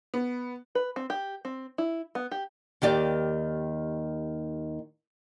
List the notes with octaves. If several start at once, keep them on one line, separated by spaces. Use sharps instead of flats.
B3
B4
C4
G4
C4
E4
B3
G4
D#2 D#3 G4 D5